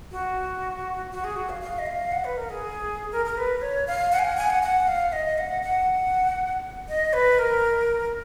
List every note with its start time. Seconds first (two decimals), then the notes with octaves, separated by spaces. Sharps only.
0.11 F#4
1.11 F#4
1.24 G#4
1.36 F#4
1.49 F5
1.61 F5
1.79 D#5
1.86 F5
2.12 F#5
2.24 B4
2.37 A#4
2.50 G#4
3.12 A#4
3.26 A#4
3.37 B4
3.62 C#5
3.87 F5
4.12 F#5
4.19 G#5
4.24 F#5
4.37 G#5
4.50 F#5
4.63 F#5
4.87 F5
5.12 D#5
5.38 F#5
5.63 F#5
6.88 D#5
7.13 B4
7.39 A#4